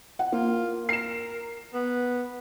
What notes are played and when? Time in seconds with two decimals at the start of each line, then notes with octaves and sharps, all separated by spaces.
0.19 F#5
0.32 A#3 F4
0.89 A#4 C7 E7
1.74 B3